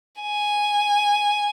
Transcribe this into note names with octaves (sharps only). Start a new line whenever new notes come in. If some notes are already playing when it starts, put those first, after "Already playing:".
G#5